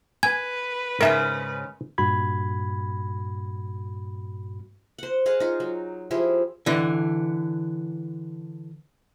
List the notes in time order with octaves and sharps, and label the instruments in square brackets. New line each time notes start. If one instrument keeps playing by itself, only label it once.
[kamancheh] B4 [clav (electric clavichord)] G#5 [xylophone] G#6
[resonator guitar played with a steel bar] G#2 C#3 C#4 [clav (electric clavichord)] A#4 E5
[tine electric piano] G2 A#2 F#4 B5 G#6
[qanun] C5 F#5
G#4 D#5 F5 F#5
D#4 F4
F#3
F3 E4 G4 G#4
[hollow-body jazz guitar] D3 E3